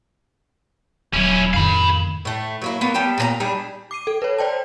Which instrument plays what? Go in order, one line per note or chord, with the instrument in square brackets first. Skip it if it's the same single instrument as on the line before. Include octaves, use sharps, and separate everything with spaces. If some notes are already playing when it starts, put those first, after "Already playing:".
[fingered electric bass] D#1 F#3 [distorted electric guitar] C#4 E4
[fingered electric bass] F2 A2 D#3 [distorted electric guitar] F5 B5
[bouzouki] A2 A3
F#3 A#3 E4
A#3 B3
G3 B3 G5 A5
A#2 G#4 A#5
G3 D4 D#4 G#4
[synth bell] D6 C7 D#7
A4
B4 C#5
C5 D5 G5 A5